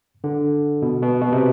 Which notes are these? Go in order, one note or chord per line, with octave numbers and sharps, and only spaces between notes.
D3
B2
B2
B2
C3